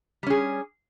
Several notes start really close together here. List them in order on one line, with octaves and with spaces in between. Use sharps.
G3 C#4 G#4